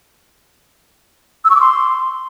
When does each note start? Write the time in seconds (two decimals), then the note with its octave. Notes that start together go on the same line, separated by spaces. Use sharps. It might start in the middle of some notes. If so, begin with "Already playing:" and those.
1.45 E6
1.50 C#6
1.55 D6
1.61 C6